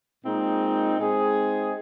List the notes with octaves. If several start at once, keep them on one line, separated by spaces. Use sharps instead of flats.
A#2 G#3 C4 D#4
G#3 C4 D#4 G#4